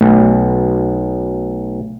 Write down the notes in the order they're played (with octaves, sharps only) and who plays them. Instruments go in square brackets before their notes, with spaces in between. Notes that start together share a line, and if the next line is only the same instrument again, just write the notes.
[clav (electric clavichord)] B1 [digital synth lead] A3